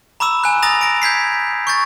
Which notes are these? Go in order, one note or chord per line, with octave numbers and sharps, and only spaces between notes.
A#5 B5 D6 E6 E7
G#5 F#6
A#5 D#6 A6 A#6 F7
A#6 D7
G6 G#6 B6 C7
C#6 G6 A6